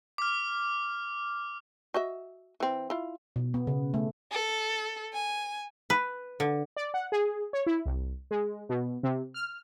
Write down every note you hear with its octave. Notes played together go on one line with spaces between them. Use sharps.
D6 F6
F#4 D#5 E5
E3 C4
E4 F4
B2
B3
C#3
A3
A4
G#5
B4
D3
D5
F#5
G#4
C#5
E4
C2
G#3
B2
C3
F6